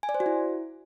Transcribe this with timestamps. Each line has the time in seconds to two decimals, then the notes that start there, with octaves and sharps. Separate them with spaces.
0.03 G#5
0.09 D5
0.15 C5
0.20 F#4
0.26 E4